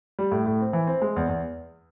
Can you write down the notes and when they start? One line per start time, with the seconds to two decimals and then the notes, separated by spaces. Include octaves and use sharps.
0.19 G3
0.32 A2
0.46 A2
0.60 C4
0.73 E3
0.87 C4
1.02 G#3
1.16 E2
1.29 E2